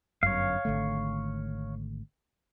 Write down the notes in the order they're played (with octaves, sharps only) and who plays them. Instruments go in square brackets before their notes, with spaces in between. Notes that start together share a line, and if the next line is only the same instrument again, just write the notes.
[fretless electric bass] G1 F#2 [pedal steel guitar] C#5 F5
[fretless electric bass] G#1 D3 A3